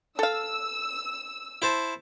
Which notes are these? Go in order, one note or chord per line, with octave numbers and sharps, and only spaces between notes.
A4 F5 E6
E4 C5 A5